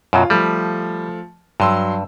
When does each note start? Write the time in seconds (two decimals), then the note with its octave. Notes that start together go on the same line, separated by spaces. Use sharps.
0.13 F#2 B2 F#3 F4
0.30 F3 G3 A3
1.60 G2 F#3 C6 E6